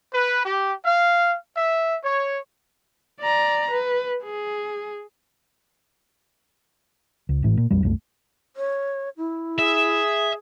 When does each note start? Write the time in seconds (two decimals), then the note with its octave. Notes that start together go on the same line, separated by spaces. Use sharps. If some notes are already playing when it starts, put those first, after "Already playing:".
0.12 B4
0.44 G4
0.83 F5
1.55 E5
2.02 C#5
3.21 D5 A#5
3.70 B4
4.23 G#4
7.29 C#2
7.43 G#1 A2 E3
7.57 A#2
7.71 A#1 F2 G3
7.83 C2 F#2 G#3 A3
8.56 C#5
9.17 E4
9.59 G#4 E5